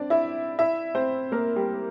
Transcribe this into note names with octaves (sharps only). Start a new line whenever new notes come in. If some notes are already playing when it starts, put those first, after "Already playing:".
Already playing: C4 D4 D5
E4 E5
E4 E5
C4 C5
A#3 A#4
G3 G4